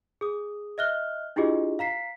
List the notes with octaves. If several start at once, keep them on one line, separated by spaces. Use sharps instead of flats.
G#4 D#6
D#5 E5 F6 F#6 G7
D4 E4 F4 G4 G#4 D#5
F5 A#5 B6 C7